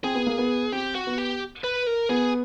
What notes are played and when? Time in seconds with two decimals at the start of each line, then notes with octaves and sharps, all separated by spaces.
0.04 C4 G#4
0.15 B3
0.27 A#3
0.38 B3
0.72 C4 G4
0.95 F#4
1.07 B3
1.18 G4
1.64 B4
1.87 A#4
2.09 B3 G#4